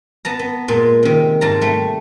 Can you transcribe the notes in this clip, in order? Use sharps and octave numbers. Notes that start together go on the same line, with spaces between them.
B3 A5 A#5
B3
A#2 G#3
C3 D#3
G#2 A5 A#5
G3 A3